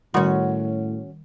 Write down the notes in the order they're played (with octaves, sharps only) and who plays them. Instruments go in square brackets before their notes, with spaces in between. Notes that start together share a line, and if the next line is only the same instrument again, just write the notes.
[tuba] A2 [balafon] D#3 G3 C6 [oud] C#4 F#4